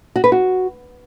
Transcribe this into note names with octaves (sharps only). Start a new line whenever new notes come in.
F#4
B4
F#4